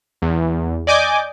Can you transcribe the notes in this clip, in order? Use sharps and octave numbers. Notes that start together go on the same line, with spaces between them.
E2
D5 D#5 G#5 D6 G6